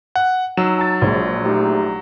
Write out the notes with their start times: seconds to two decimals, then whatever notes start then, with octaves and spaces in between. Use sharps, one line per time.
0.16 F#5
0.57 F#3 D#4 E6 E7
0.78 A5 A6
1.02 A#1 G#3 C#5
1.45 A3 D#4 G4